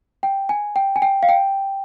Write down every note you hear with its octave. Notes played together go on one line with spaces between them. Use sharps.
G5
G#5
G5
G#5
G5
F5
G5